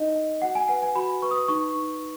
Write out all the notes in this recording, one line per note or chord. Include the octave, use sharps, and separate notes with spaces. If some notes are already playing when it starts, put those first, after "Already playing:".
Already playing: D#4 D#5
D#4
F#4 F#5
G#5
B4 F#5
G#5
F#4 B5
B4 C#6
D#6
D#4 C#6
D#4